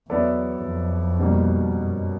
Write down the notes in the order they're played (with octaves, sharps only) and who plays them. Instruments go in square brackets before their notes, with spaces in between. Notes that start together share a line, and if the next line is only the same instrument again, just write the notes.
[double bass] E2 [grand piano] F#3 B3 E4 A4 D5
[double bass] F2
[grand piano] B2 G3 A#3 D#4
[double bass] F#2